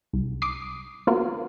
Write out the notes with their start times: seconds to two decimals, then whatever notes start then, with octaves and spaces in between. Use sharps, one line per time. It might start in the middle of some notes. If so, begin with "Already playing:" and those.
0.13 C2
0.42 D6 D#6 C7
1.07 A#3 B3 F4 F#4 A#4